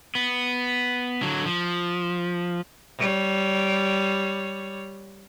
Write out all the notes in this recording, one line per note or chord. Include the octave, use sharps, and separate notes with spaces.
B3
D3 F#3
F3
G3 C#5